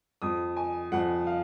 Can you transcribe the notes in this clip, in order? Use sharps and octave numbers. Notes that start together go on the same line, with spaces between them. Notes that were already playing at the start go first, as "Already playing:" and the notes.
F2 F3 D#6
G#5
F2 F3 F#5
F5